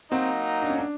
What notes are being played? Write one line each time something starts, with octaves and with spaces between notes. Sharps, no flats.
F#3 A#3 C4 D#4
D4
C#4
D4